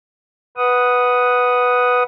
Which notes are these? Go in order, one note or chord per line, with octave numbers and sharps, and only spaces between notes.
B4 F#5 D#6